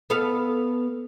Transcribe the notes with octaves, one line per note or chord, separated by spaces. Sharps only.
B3 A4 F5